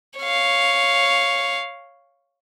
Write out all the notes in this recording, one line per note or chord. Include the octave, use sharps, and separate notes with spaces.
C#5 F5